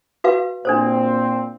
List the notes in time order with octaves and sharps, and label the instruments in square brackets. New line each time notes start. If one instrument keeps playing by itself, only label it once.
[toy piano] F#4 B4 F5
[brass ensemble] A#2 C4 [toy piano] D4 A4 C5